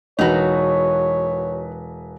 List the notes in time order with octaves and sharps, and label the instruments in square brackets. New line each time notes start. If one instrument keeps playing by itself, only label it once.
[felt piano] E1 B4 [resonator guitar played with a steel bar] D#4 F#4 [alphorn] C#5